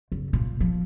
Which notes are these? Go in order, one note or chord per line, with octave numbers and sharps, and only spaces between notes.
F#1
A#2
F3